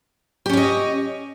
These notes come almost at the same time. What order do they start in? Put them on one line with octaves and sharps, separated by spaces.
G4 C#4 C#5 D#5